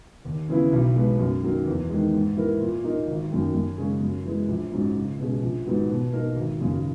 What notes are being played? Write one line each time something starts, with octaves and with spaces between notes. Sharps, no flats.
D#2
C#3 E3 B3 E4
B1
B2 G#3 B3
F#2
D#3 F#3 A#3
E2
D#3 G#3
G#2
E3 A#3 E4 A#4
A#2
A#3 D#4
G#1
F#2 D#3
F#2
C#3 G#3 C#4
F#2
E3 G#3
A#1
G#2 F#3 C#4
C#2
B2 G#3 C#4 G#4
A#1
G#2 D#3 F#3 B3
B2
A#3 D#4 A#4
G#1
F#2 C#3